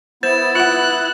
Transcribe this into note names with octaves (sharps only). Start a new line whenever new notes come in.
B3 E4 C5 A6 E7
F4 F#5 F#6